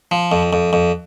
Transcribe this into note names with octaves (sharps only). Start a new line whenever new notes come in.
F3
F2
F2
F2